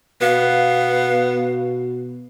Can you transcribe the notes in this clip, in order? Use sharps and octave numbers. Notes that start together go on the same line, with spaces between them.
B2 B3 F5